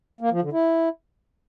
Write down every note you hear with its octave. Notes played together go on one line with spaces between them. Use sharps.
A#3
F3
D3
E4